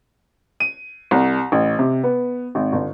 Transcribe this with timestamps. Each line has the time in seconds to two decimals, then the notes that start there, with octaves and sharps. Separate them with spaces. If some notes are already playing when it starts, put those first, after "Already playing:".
0.60 D#7
1.11 C2
1.52 A1
1.79 C3
2.04 B3
2.55 G#1
2.72 G1